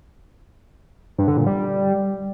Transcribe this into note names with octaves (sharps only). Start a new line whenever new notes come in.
G2
D3
A#2
G3